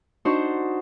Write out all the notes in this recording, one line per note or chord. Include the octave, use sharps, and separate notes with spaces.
D4 D#4 F#4 C5 F#5 C#6